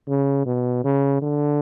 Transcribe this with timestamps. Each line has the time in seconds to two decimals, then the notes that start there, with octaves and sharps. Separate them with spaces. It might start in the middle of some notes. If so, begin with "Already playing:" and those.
0.08 C#3
0.46 B2
0.85 C#3
1.22 D3